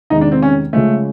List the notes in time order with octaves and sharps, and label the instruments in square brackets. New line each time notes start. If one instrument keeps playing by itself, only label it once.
[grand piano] E2 C3 D#3 G#3 [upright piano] D#4
[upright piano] D4
C4
C#4
[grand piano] C#3 F3 G#3 C#4 [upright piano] A3